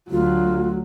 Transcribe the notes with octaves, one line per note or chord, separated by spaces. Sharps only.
D2 F#3 F4 F#4